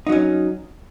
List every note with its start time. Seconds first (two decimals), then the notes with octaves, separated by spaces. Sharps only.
0.07 D#4
0.09 F#3
0.12 C#4